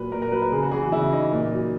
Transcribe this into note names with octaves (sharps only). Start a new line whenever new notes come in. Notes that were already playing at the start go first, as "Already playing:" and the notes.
Already playing: A#2 F#3 B4
A#2 A#4
A#4
F#3 B4
A#4
C#3 G#4
F#4
E3 G#4
F#4
C#3 E4
E3 D#4
A#2
F#3